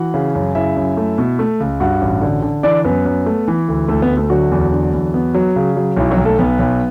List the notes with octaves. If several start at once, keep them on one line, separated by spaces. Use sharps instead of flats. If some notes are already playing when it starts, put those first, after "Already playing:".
Already playing: E3 F#4 F#5
C#3
F#2
C#3 E4 E5
F#2
A3
B2
A3
C#2
G2 F#4 F#5
A1
D3
D3
E3 D4 D5
F#2 B3 B4
F#2
A3
E3
D2
D2 A3 A4
B3 B4
D2
A3 A4
D3 F#3 F#4
E2
D3
E2
B3
F#3
C#3
F#3
B1 E4
F#3 F#4
B1
A3 A4
B1 B3 B4
B1